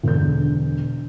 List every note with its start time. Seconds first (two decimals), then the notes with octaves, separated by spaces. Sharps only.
0.03 E1 D3 G6